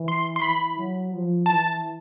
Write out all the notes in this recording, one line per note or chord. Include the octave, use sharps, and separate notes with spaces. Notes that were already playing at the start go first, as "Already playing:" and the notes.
Already playing: E3
C6
C6
E3 B5
F#3
F3
E3 A5